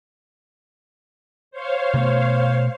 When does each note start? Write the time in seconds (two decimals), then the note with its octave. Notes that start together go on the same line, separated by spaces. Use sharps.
1.51 C5 C#5 F5
1.94 B2 A3 B3